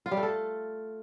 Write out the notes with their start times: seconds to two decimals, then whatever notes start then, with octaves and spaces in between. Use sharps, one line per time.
0.06 F4
0.11 G3
0.17 A3
0.23 A4